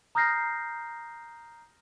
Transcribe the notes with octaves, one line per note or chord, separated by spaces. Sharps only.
A#5 D#6 F6 G6 A#6 C7